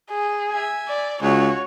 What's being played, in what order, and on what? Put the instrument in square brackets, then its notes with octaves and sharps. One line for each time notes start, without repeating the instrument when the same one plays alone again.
[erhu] G#4
[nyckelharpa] E5 G#5
[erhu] D5
[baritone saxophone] C#2 [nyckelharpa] F#4 [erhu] C#5